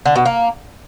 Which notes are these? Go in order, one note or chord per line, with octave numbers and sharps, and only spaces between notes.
D3
B2
A#3